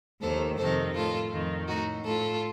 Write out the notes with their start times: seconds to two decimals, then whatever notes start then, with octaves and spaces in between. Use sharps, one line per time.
0.21 D#2 D#3 A4 C5
0.58 F2 C3 D#3 A4 C5
0.95 A2 F4 A4
1.31 F2 D#3
1.68 A2 D#4 F#4
2.04 A2 F4 A4